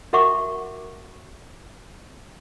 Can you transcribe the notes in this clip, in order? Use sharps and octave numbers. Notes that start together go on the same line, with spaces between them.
F#4 A#4 E5 F#5 C#6 D6